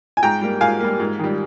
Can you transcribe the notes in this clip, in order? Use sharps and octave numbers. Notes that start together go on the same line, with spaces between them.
G#5
G#2 G5 A#5
G3 A#3
G#2 F5 G#5
G3 A#3
G#2
D#3 G3